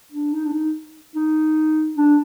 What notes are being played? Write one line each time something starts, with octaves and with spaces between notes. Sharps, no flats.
D4
D#4
D4
D#4
D#4
D4